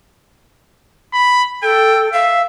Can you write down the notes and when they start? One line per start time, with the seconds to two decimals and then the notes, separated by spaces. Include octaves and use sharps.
1.13 B5
1.63 A4 G5
2.13 E5 F5